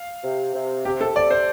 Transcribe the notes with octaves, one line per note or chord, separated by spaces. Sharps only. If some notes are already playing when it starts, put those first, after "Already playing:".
Already playing: F5
C3
C3
C3 G4
A4
C3 D5
C5